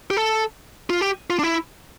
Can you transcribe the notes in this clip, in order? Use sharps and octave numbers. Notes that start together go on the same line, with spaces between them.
G4
A4
F4
G4
F4
D4
E4